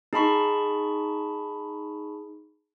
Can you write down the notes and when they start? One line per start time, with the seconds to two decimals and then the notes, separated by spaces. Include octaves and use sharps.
0.13 D#4 G#4 A5 B5 C#6